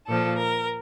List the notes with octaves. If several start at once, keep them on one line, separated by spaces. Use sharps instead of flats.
A#2 F3 A4
A#4